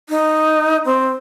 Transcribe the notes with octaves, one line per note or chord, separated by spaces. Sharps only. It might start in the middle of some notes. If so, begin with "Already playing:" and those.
D#4
C4